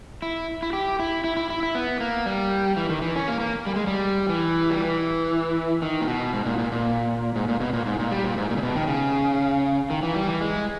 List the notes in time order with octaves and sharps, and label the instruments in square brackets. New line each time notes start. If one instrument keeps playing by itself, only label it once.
[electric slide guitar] E4
E4
G4
E4
E4
E4
E4
E4
B3
A#3
G3
E3
D#3
E3
C#4
A#3
A#3
G3
G#3
G3
E3
G3
E3
D#3
A#2
B2
G#2
A#2
A#2
A#2
G#2
A#2
B2
A#2
G#2
A#2
G3
A#2
G#2
A#2
C#3
B2
D#3
C#3
D#3
E3
G3
E3
G#3